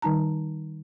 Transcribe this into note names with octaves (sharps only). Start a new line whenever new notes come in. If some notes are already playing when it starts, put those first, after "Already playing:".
D#3 G3 D#4 A5 A#5